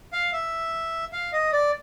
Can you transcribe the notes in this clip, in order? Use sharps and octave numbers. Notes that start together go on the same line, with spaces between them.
F5
E5
F5
D#5
D5